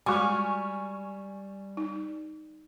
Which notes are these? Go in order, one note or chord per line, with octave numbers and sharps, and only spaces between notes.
G3 G#3 F#4 G#5 C#6 D6 F6
D#4